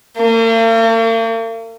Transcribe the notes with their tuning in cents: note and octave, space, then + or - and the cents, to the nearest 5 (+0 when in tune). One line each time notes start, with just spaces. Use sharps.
A#3 -45